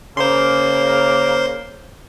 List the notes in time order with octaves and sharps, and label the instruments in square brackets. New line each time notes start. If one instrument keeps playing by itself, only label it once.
[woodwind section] C#3 A#3 [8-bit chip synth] C5 C6